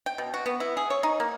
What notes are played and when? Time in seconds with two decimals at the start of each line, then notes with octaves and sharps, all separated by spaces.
0.06 G5
0.18 B2
0.34 F#4
0.46 B3
0.60 E4
0.77 G#4
0.90 C#5
1.03 D#4
1.20 A#3